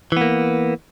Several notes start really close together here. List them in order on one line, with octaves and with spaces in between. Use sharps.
E3 B3 A#3